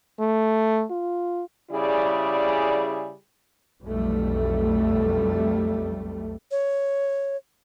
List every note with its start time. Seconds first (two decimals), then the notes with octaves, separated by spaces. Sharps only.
0.20 A3
0.91 F4
1.71 C#3 G3 E4 G#4 D5
3.83 B1 F2 G3 A3
6.51 C#5